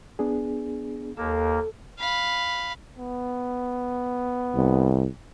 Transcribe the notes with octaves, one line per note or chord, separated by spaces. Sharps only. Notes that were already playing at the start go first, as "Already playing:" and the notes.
B3 D4 G#4
D#2 A#3 A4
F5 B5
B3
C2